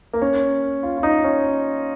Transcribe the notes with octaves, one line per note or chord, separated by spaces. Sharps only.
A#3
C#4
F4
F4
D#4
C#4